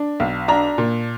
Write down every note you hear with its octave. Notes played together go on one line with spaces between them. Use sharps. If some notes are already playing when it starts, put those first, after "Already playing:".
Already playing: D4
B1
D4 A#5
A#2